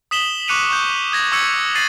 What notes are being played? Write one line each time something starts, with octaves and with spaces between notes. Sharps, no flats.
D#6 B6 E7 F#7 G7
C#6 D6 F#6 C#7 D#7 F7
C#6 G6
D#6 G#6 A#6
C#6 D6 E6 G#6 C#7 F#7
A6 C7 D#7 F#7